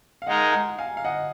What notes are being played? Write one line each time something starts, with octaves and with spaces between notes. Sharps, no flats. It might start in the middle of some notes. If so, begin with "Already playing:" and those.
F5
G#3 D#4 A#4 D#5 F#5
F#5 A#5
F5 G#5
F5
D#5 F#5